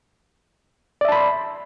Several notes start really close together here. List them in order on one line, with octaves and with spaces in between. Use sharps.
D5 E5 A5 B5 C6